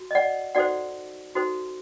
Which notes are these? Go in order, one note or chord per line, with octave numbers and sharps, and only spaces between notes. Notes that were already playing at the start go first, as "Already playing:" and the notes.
Already playing: F#4
D#5
D5 F#5
D#4 F#4 A4 C5 D5 F#5
D#4 F#4 A4 C5